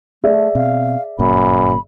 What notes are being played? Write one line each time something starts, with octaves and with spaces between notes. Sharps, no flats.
A3 G#4 D5 E5
B2 C4 F5
G1 F#2 A#2 A#3 B5